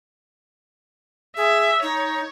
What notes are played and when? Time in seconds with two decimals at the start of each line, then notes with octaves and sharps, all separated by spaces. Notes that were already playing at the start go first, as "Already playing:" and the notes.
1.37 G#4 E5
1.82 D#4 C#5